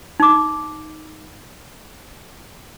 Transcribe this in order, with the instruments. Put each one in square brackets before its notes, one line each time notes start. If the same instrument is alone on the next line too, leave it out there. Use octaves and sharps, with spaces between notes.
[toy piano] D#4 D6